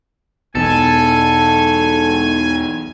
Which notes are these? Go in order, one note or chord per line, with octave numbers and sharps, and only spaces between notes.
B1 E2 B2 A4 G#5